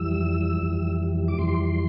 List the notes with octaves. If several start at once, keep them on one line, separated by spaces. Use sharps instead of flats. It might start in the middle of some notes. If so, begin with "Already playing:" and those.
Already playing: F2 E3 G3 E6
F2 E3 G3
D6
F2 E3 G3 C6